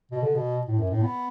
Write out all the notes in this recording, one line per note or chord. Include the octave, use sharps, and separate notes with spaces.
B2
D3
B2
A2
F#2
A2
B3